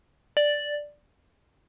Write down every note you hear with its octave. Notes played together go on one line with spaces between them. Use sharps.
D5